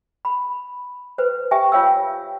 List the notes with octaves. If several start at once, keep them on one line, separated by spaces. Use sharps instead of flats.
B5
B4 C5
G4 E5 G5 G#5
F4 C#5 F5 G5 E6